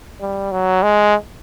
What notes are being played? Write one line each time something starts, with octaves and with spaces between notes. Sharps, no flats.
G3
F#3
G#3